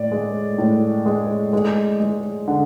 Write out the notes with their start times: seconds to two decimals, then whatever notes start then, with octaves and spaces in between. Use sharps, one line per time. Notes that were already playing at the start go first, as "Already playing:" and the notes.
Already playing: A2 D5
0.11 G#3
0.58 A2
1.06 G#3
1.53 G#3
2.00 G#3
2.48 D3